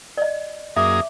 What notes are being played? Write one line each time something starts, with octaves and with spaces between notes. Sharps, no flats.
D5 D#5
F#2 A#3 G#4 E5 D6 D#6